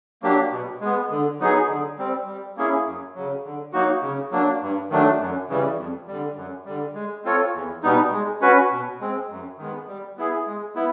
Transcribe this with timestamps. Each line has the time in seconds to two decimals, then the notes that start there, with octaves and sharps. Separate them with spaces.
0.22 F#3 A#3 D4 G4
0.52 B2
0.81 G#3 B3
1.11 D3
1.40 F#3 B3 D#4 G#4
1.69 D3
1.98 G3 C4
2.27 G3
2.57 A#3 C#4 E4 G#4
2.86 F#2
3.15 C#3 F#3
3.45 D3
3.73 F#3 A#3 D#4 F#4
4.02 C#3
4.31 F#3 A#3 D4
4.62 G2
4.90 D#3 F#3 A3 D4
5.20 F#2
5.49 C#3 E3 G3
5.78 F2
6.08 D3 G3
6.36 F#2
6.66 D3 G3
6.95 G#3
7.25 C4 F4 A4 C#5
7.54 E2
7.83 B2 G3 B3 D#4
8.13 G#3
8.41 C#4 F#4 B4
8.71 B2
9.00 G#3 C4
9.30 F#2
9.58 D#3 G#3 B3
9.88 G3
10.17 B3 E4 G#4
10.47 G#3
10.75 B3 E4